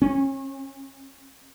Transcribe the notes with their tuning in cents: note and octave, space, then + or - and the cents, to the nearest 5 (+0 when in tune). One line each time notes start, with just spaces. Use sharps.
C#4 -35